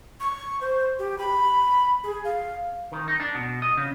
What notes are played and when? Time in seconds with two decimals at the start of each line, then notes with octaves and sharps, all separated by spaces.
0.20 C#6
0.61 C5
0.99 G4
1.18 B5
2.04 G#4
2.24 F5
2.92 D#3
3.08 D#4
3.20 D4
3.34 B2
3.62 D#5
3.77 C#3